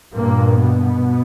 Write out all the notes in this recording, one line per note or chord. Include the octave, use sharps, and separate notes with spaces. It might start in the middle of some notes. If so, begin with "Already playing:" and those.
G2 A#2 A#3
B2 B3